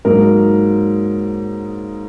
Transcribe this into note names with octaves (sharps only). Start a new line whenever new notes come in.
G#2 F#3 A#3 D#4 A#4